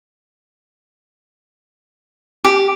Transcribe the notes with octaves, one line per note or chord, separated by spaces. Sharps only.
G4